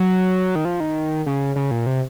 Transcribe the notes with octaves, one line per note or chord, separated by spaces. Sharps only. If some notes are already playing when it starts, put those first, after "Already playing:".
Already playing: F#3
D#3
F3
D#3
C#3
C#3
A#2
C3